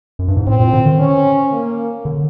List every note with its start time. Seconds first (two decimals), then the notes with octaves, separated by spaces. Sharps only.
0.19 F#2
0.28 G2
0.37 G#2
0.47 A2 C4
0.60 A#2
0.73 D3
0.86 D#3
0.99 C#4
1.52 A#3
2.05 D3